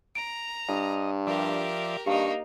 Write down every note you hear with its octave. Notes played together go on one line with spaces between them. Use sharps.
A#5 D7
G2 D#5
F3 G4 A#4 D5 E5
G2 A#3 D#4 G4 F5 C#6